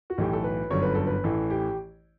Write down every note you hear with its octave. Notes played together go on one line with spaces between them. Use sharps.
F#4
B1 A2 E3 G4
A4
B4
G1 F#2 D3 C#5
B4
A4
B4
A1 A2 E3 A4
G4